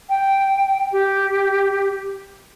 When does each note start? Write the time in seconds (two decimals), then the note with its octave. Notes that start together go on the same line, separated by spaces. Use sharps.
0.09 G5
0.92 G4